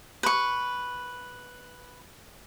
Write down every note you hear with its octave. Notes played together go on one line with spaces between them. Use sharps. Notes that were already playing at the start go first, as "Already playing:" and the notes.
B4 C#6